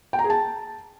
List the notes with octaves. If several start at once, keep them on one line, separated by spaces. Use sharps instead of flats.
G5
A#5
G#4
A5